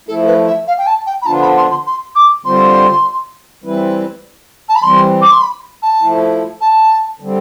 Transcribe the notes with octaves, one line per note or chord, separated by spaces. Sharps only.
F3 A3 E4 A4
B4
E5
F5
G5
A5
G5
B5
D3 F3 B3 D4 F4 A5
B5
C6
C6
C6
D6
D3 G3 C4 F4 C5 C6
E3 G3 C4 E4 B4
A5
B5
E3 G3 C4 C6
D6
C6
B5
A5
F3 A3 E4
A5
D3 G3 C4